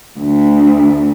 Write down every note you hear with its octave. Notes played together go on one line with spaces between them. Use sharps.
D2